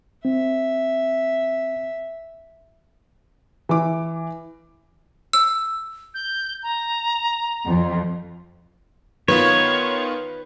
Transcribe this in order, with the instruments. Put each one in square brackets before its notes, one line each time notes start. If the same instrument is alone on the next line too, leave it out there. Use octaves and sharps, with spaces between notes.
[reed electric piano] C4 [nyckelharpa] E5
[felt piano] E3 D6
[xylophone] E6
[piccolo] G6
A#5
[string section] F2
[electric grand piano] D#3 B3 F4 [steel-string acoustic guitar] B4 [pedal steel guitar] C#5